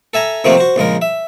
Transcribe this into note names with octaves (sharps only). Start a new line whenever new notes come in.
A4 E5 G#5 A#5
C3 D#3 F3 A3 A#3 C4
F#4 C5
A#1 C#3 G#3 A#4
E5